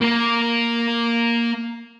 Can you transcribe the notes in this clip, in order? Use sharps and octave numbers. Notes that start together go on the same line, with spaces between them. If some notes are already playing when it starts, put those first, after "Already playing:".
A#3 A#4